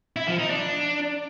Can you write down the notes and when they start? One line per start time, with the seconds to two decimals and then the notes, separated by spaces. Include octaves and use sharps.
0.16 E4
0.28 F3
0.39 D#4
0.50 D4